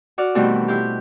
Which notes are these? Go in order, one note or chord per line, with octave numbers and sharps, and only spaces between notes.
F#4 D5 F6
B2 D#3 E3 G3 A3 C4
E4 F4 G4